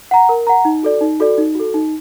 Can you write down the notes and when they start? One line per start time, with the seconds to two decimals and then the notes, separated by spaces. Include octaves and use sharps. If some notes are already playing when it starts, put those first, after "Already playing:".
0.11 F#5 A#5
0.29 A#4
0.47 F#5 A#5
0.65 D#4
0.83 F#4 A4 D5
1.01 D#4
1.20 F#4 A4 D5
1.38 D#4
1.55 F#4 A4
1.74 D#4